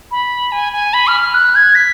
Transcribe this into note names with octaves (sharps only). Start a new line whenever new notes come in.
B5
G#5
G#5
B5
F6
F6
F#6
G#6
B6